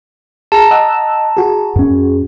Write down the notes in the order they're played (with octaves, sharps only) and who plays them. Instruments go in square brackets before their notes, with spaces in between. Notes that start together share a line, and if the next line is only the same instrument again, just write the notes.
[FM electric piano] G#4 [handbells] A5 A#5
[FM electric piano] D#5 F#5 E6
F#4 G#4
[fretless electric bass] F#2 C#4